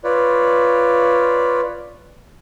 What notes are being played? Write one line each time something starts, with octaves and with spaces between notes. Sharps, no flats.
F4 B4 C#5 D5